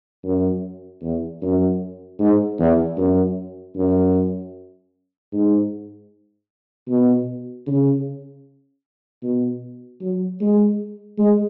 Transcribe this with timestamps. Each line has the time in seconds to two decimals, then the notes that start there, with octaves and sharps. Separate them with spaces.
0.24 F#2
1.02 E2
1.42 F#2
2.19 G#2
2.59 E2
2.98 F#2
3.76 F#2
5.33 G#2
6.88 B2
7.67 C#3
9.23 B2
10.02 F#3
10.41 G#3
11.19 G#3